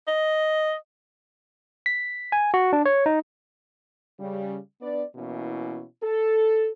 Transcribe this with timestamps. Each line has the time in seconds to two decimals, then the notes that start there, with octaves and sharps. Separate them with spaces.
0.08 D#5
1.86 B6
2.32 G#5
2.54 F#4
2.73 D4
2.86 C#5
3.06 D#4
4.20 C#3 G3
4.81 B3 D4 B4 D5
5.16 B2 E3 A#3 C#4 E4
6.03 A4